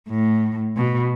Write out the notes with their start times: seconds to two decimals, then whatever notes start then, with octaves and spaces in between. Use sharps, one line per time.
0.09 A2
0.76 B2